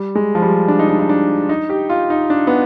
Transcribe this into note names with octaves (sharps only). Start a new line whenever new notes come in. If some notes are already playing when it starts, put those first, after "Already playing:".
Already playing: G3
G#3
F3
G3
D4
D#4
D4
D#4
D4
D#4
G4
F4
D#4
D4
B3